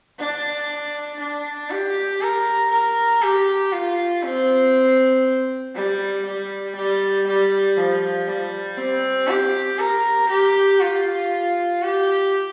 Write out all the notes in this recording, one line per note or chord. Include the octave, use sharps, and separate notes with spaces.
D4
D4
G4
A#4
A#4
G4
F4
C4
G3
G3
G3
G3
F3
G3
C4
G4
A#4
G4
F4
G4